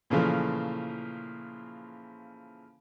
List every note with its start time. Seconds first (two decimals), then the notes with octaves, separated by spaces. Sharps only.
0.10 A#2 C#3 E3 F3 A3